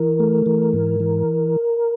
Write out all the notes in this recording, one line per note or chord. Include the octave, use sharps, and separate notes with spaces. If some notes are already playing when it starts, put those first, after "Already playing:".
Already playing: E3 A#4
A3
E3
G#2
E3